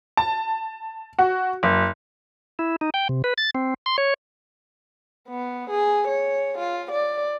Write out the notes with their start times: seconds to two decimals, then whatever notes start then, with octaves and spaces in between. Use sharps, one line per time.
0.17 A5
1.19 F#4
1.63 F#1
2.59 E4
2.81 D#4
2.94 G5
3.09 C3
3.24 B4
3.38 A6
3.55 C4
3.86 C6
3.98 C#5
5.28 B3
5.70 G#4
6.08 C#5
6.58 F4
6.91 D5